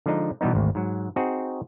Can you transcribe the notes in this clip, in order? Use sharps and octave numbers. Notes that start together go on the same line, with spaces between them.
D3 F3 G#3 D4 D#4
B2 E3 G3 B3 D#4
G#1 D2
G#2 F#3
C4 D#4 F#4 G#4